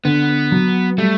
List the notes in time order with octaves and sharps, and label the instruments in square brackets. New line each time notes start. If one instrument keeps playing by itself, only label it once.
[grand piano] D3 [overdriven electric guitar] B3
[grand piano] F#3
[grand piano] G3 [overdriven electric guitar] A3